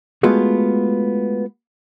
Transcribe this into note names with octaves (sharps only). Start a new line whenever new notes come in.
G#3 A3 B3 F4 F#4 G#4